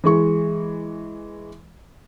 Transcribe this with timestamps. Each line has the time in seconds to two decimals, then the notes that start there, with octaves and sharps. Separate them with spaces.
0.04 E3 G#3 C#6